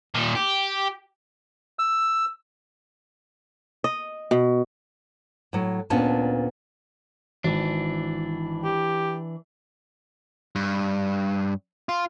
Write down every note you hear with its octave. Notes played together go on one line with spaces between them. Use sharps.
A#2 D#3
G4
E6
D#5
B2
A2 F#3
D2 A#2 B3 C#4 D4 A5
G#1 E3 D4
G4
G2
F4